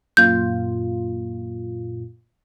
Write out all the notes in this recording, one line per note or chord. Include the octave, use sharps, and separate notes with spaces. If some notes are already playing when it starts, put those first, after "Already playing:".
F#2 A#2 F4 G6